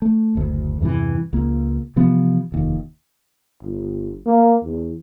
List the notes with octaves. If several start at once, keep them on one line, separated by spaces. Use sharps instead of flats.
A3
F#1 D2
E2 G2 C3 E3
C#2 A#3
C3 E3 F3 B3
F1 D#2
G1
A#3
E2